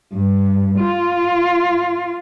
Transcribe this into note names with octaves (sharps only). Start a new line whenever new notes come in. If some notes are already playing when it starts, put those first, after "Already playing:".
G2
F4